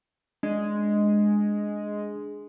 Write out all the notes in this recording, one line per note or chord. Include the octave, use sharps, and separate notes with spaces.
G#3 D4